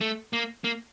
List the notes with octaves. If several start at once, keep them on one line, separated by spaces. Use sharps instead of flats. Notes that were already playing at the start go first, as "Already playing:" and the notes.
A3
A#3
A#3